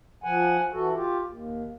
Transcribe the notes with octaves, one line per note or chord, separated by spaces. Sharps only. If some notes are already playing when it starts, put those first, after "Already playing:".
F3 F#5 G#5
E3 F#4 A4
F4 G4
D#2